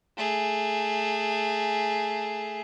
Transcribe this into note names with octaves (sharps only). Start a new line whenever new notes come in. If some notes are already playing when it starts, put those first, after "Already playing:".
A3 G#4